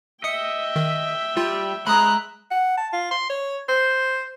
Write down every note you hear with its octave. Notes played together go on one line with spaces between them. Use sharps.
D#5 E5 G5 D#6 C#7
D#3
G3 F4
G#3 A#5 B5 D#6 F#6
F#5
A5
F4
C6
C#5
C5